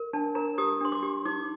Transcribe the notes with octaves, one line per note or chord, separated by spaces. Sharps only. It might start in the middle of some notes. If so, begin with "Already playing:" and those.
Already playing: A#4
D4 A5
A#4 A#5
G4 D#6
D4 C6
D6
G4
D#4 D6